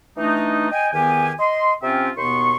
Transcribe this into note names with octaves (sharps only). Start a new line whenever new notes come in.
E3 A3 D4 D#4
D#5 G5 G#5
E2 D#3 B3 G4 G#5
D#5 C6
C3 C4 C#4 F4 E5 G5
D#2 B2 B3 C6 C#6